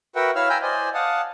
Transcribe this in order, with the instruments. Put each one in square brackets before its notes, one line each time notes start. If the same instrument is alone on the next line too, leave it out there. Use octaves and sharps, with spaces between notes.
[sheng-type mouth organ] F#4 A#4 B4 E5 F#5 G5
E4 C#5 E5 F5 E6 F6
G5 G#5 A#5 B5 E6 G6
C5 D5 D#5 G#5
F5 F#5 A5 D#6